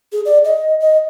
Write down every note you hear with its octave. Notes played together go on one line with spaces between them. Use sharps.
G#4
D5
D#5
D#5